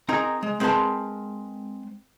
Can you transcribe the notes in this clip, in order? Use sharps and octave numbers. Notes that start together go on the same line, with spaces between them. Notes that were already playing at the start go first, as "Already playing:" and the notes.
C4 D#4 G#4 A#4 A#5
G#3
G#3 C4 A#4 B4 A5 C6